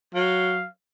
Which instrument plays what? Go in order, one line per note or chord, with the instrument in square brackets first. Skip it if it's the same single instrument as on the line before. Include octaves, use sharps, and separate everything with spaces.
[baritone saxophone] F#3 [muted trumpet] F5